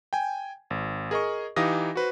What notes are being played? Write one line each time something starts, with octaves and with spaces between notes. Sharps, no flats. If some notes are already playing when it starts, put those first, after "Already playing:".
G5 G#5
G#1
G#4 A#4 D#5 C#6
E3 D#4 G4 F5 D#6 A#6
F#4 B4 C5